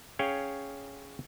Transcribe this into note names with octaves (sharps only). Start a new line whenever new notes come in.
C#4 G#4 C#5 F5 G5